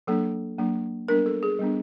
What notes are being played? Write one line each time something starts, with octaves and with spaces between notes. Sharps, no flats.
F#3 A#3 D4 A4
F#3 A#3 D4
G3 B3 D4 A#4
A4
G#4
G3 B3 D4